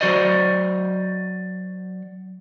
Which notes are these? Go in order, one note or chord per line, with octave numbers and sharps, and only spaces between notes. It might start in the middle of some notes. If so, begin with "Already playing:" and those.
F#3 A#3 F#4 C5 D5 D#5